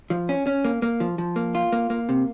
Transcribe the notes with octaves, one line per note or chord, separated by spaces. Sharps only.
F3
C#4
C#4
A#3
A#3
F3
F3
A#3
F4
A#3
A#3
C3